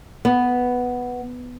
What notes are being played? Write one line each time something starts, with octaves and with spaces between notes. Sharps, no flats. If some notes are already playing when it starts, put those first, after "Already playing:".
B3